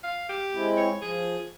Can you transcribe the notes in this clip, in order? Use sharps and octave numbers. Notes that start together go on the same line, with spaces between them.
F5
G4
G#3 C4 E4
C#5
F3 G#4